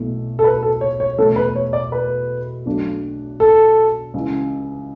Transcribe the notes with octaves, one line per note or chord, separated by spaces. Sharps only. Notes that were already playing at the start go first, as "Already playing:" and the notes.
Already playing: B1 B2 A3 E4
A4
B4
A4
C#5
C#5
E2 B2 A3 A4
B4
C#5
D5
B4
B1 B2 A3 D4
A4
C#2 C#3 E3